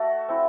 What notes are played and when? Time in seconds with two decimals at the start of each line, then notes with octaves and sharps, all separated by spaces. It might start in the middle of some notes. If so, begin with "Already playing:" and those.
Already playing: A3 F#4 A4
0.28 C4 E4